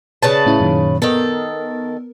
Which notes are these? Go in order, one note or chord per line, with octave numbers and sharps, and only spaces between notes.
C#3 B4 A5
A2 C#4 E4
F#2 A#2 D#3
D#3 B3 A4 A#4